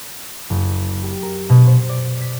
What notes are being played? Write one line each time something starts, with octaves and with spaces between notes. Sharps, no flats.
F#1
G4
A#4
B2
C5
D5
B6